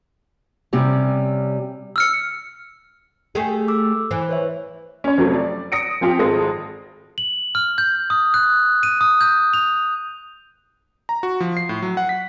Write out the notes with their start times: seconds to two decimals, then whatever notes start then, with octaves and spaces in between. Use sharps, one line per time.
0.73 C3 G3 C#4
1.96 E6 F6 C#7
3.35 A3 G4 G#4
3.68 D6 E6
4.11 E3 C5
4.29 B4 C#5 E5
5.04 C#4 C#5
5.18 F2 C3 F#3 A3
5.34 D5
5.72 D#6 A#6 C#7 D7
6.01 F3 C4 F4 G4
6.19 G#1 G#3 F4 A4 D#6 A#6
7.18 F#7
7.55 F6
7.78 G6
8.10 D#6
8.34 F#6
8.83 D#7
9.01 D#6
9.21 G6
9.53 F7
11.09 A#5
11.23 F#4
11.40 F3
11.57 C7
11.69 A2
11.82 F#3
11.97 F#5
12.09 B6